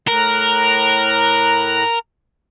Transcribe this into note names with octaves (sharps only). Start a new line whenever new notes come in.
A2 A#4 A#5 F#6